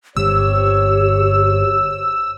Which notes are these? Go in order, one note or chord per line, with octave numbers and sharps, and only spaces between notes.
G1 C4 G4 C5 C#5 E6